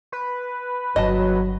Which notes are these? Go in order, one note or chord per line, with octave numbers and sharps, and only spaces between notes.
B4
G1 D#3 F#3 D#5 A5